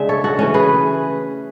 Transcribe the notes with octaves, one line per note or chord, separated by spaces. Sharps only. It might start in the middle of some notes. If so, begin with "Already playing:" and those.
Already playing: C#3 G#3 D4 E5
A4 C#5
F#4 A4
E3 A3 C#4
G#4 B4